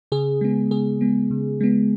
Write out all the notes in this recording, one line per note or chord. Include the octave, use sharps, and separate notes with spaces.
C#3 G#4
G#3 B3
C#3 G#4
G#3 B3
C#3
G#3 B3